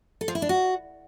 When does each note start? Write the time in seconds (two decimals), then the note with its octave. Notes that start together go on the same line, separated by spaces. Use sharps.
0.21 A4
0.28 F3
0.35 E4
0.42 D4
0.49 F#4